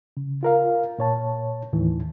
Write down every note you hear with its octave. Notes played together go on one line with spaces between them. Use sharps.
C#3
F4 A#4 F5
A#2 C#5 A5
D#2 A2 D#3 E3